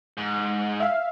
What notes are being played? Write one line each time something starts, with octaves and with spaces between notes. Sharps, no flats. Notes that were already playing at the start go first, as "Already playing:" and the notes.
G#2
E5 F5